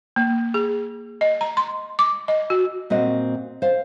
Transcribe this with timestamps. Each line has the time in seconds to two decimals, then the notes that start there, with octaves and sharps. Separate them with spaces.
0.16 A#3
0.54 G#4
1.21 D#5
1.41 A#5
1.57 C6
1.99 D6
2.28 D#5
2.50 F#4
2.90 A#2 C4 F#4 D#5
3.62 C5 F5